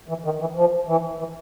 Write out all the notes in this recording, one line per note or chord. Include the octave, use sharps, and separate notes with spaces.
E3
D#3
E3
F3
E3
E3